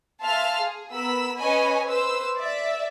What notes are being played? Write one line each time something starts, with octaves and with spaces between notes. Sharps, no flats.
E5 F5 G#5 A5 C6 F6
G#4
B3 A#4 B5 E6
C#4 B4 C#5 D#5 G#5 B5
B4 C5 E6
D5 E5